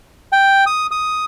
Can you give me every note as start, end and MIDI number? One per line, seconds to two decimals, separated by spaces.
0.32 0.64 79
0.66 0.87 87
0.91 1.25 87